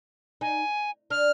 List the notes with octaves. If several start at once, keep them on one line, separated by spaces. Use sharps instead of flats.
D#4 G#5
D4 F6